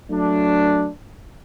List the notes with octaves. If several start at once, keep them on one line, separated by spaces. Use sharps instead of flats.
F#3 A3 D4